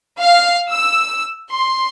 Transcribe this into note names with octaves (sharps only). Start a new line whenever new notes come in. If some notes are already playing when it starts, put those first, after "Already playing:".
F5
E6
C6